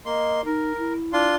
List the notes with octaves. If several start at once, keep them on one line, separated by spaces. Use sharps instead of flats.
A#3 D#5 C6
D#4 A#4
E4
D4 F4 C6